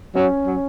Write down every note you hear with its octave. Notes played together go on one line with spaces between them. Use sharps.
F#3 C#4
F#3